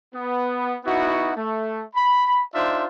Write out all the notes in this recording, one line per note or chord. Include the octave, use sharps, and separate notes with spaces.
B3
B3 D#4 E4 F#4
A3
B5
D4 D#4 F4 C5 E5